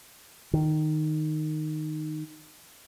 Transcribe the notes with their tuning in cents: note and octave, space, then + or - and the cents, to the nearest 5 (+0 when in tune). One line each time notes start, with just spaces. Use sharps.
D#3 -10